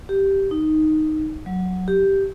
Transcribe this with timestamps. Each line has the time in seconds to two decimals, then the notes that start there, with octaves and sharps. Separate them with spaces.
0.09 G4
0.51 D#4
1.46 F#3
1.88 G4